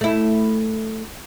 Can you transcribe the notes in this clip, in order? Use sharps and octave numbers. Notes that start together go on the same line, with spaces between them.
A3 E4